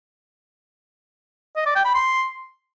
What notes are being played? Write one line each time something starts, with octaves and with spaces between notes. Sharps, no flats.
D#5
D5
G5
B5
C6